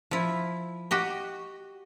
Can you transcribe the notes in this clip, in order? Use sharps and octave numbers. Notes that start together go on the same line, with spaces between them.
F3 E4
F#4 G4 D#5